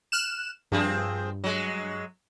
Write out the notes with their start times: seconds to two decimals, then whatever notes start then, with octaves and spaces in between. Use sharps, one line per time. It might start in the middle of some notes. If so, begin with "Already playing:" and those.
0.12 F6 F#6 E7
0.72 G2 F3 C4 G#4
1.44 F#3 G#3